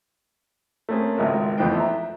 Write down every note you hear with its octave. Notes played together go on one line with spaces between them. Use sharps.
A3 A#3 C4 C#4 G#4
G#1 C#2 G#3 A#4 E5
F2 E3 A3 B3 C5 G5
E5 A#5